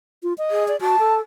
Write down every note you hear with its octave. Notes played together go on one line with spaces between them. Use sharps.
F4
D#5
G#4
D5
F#4 A5
A4